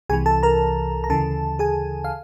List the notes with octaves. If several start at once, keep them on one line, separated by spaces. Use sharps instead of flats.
C2 C3 E3 G#4 G#5
A4 A5
A#4 A#5
A#5
D2 C#3 E3 A4 A5
G#4 G#5
F5